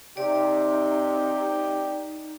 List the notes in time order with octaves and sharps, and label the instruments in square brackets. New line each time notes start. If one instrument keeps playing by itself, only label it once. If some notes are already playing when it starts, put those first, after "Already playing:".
[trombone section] C3 [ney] D#4 [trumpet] G4 [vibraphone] D5